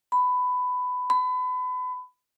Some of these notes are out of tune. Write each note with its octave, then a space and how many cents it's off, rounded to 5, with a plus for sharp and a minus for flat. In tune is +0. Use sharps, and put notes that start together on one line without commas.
B5 +15
B5 +30